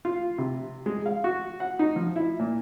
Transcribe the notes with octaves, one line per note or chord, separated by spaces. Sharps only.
F4
C3
G#3
F5
F#4
F#5
D#4
F3
E4
A#2